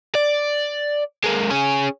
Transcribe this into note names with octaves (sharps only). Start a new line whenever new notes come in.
D5
G#3 A#3
C#4 G#4